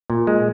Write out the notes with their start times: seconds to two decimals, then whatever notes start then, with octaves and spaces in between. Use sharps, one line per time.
0.10 A#2
0.27 G#3